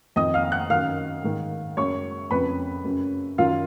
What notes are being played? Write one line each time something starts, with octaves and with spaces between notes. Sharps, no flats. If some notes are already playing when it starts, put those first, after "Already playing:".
F2 D#3 D#5 D#6
F5 F6
F#5 F#6
F#2 D#3 F5 F6
G#2 D#3
F#2 C#3 C#5 C#6
F2 C#3 B4 B5
F#2 C#3
F#2 D#3 F4 F5